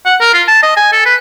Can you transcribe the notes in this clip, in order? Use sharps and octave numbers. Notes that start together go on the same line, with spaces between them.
F#5
A#4
F4
A5
D#5
G#5
A4
B4